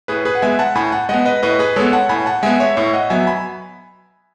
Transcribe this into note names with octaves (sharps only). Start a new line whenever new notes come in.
A2 G#4 B4
G#4 B4
F#5
G#3 B3 E5 G#5
F#5 A5
A2 G#5 B5
F#5 A5
G#3 B3 D#5 F#5
B4 D#5
A2 B4 D#5
G#4 B4
G#3 B3 A4 C#5
F#5 A5
A2 G#5 B5
F#5 A5
G#3 B3 E5 G#5
C#5 E5
A2 C#5 E5
D#5 F#5
F#3 B3 E5 G#5
G#5 B5